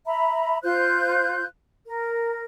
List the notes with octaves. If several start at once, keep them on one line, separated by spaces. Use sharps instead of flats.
E5 A#5 B5
F4 C5 F#6 G6
A#4